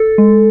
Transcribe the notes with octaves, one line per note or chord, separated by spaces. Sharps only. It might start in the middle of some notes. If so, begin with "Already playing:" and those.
Already playing: A4
G#3